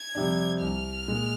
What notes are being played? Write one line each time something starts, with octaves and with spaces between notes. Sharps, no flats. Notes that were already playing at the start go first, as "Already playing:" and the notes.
Already playing: G#6
F2 C3 G3 D4
C2 F6
A#2 G#3